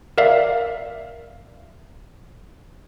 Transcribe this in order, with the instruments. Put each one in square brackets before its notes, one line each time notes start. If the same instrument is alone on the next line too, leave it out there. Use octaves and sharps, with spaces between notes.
[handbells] A#4 D5 E5 F5